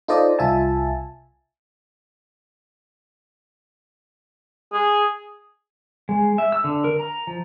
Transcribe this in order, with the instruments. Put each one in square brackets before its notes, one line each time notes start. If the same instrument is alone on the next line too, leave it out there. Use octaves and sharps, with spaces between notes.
[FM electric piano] D#4 F4 A4 C5 D5 D#5
C2 F4 E5 G#5 A5
[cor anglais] G#4
[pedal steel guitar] G#3
E5
E6
D3
A#4
A#5
F3